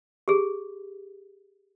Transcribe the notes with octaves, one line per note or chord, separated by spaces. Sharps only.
G4 G#4